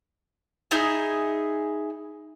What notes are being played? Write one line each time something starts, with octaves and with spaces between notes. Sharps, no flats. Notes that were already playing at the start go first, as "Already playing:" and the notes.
D#4 E4 G#4 G#5